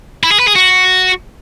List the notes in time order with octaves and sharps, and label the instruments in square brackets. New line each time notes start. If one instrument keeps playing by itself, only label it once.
[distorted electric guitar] E4
G#4
B4
G#4
F#4